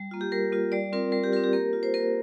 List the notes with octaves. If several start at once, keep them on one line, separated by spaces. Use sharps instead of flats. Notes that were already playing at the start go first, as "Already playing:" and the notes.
Already playing: G3
A#3 F4
G4
G3 A#4
A#3 F4
G3 D5
C4 F4 A#4
G3 A#4
G4
C4 F4 A#4
G4
A#3 A#4
F4
C5
A#3 A#4